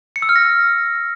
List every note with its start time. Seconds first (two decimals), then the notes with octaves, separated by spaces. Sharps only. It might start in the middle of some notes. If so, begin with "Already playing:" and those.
0.16 C#7
0.22 E6
0.29 F6
0.36 A#6